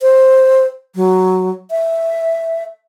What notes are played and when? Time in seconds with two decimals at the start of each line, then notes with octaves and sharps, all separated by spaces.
0.01 C5
0.95 F#3
1.71 E5